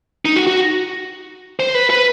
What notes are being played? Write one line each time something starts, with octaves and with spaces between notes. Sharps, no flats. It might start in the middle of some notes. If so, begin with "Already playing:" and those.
D#4
F#4
F#4
C5
B4
B4